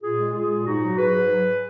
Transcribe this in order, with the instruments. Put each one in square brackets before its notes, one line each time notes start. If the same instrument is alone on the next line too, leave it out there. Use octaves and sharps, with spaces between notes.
[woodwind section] A#2 F4 G#4
G#3
G#3 F4 G#4
A#2
G#2 D#4 F#4
F#3
F#3 G#4 B4
G#2
F#3